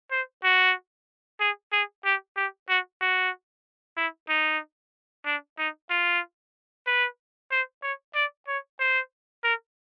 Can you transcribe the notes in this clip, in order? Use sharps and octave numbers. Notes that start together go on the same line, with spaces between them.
C5
F#4
G#4
G#4
G4
G4
F#4
F#4
E4
D#4
D4
D#4
F4
B4
C5
C#5
D5
C#5
C5
A#4